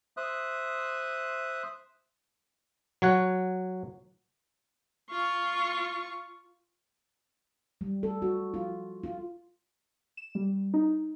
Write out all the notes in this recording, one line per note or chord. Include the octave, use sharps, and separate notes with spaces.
C5 E5 D#6 F#6
F#3 C#5 F#5
F4 C#6
G3
A4
F#4
F4
F4
E7
G3
D#4